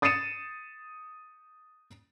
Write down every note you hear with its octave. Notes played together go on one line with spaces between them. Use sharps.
D#6 A6 C7 C#7 D#7 E7